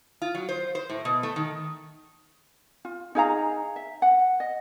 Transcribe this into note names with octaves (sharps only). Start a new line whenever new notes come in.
F4
F#3
C5
C5
A2
B2
A3
D#3
F4
D#4 G#4 F5 A#5
E5
F#5
D#5